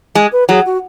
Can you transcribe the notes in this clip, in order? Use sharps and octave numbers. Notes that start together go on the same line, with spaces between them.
G#3 G#4
B4
F#3 G#4
F#4